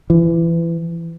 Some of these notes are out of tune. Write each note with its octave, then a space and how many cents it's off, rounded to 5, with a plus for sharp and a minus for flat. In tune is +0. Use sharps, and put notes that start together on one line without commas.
E3 +25